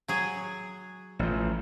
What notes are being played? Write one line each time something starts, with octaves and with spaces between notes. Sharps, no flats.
F#3 G#4
A1 F3